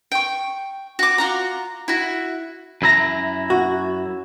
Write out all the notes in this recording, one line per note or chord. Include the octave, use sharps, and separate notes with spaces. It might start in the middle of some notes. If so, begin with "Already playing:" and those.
G5 C#6
F#4 D6
F4 F#4 A#5
E4 F#4
F#2 E4 A#5
F#4